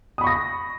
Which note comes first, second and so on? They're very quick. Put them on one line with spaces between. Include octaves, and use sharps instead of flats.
D#6 B5 C#6 A#6